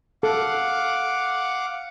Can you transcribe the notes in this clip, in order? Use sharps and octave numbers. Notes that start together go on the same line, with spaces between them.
A4 F5 F#5 D6